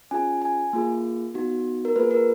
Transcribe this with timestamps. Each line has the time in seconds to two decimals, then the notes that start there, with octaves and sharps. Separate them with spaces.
0.11 C#4 F4 G#4 G#5
0.42 G#5
0.73 A#3 F4 G#4
1.34 B3 D#4 F#4
1.85 A#4
1.96 A#3 F4 G#4 B4
2.11 A#4